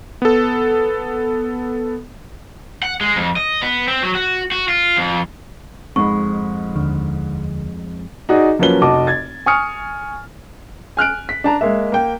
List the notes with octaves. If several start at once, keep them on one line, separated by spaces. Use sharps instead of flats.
B3 A4
F#5
G#3
F2
D#5
B3
C4
F#3
F#4
F#4
F4
F2
F2 G#2 G#3 B5 C#6
D#2 D3
D#4 F#4 G#4 D5 D#5
F3 F#3 A#3 C#4 B4 G7
F1 F#4 D#5 A5 D6
G#6 A6
G#5 C#6 D#6 F6 C#7
G#5 F6 F#6 D7
B6
D4 A5 A#5
G#3 A#3 E5
A#3 G5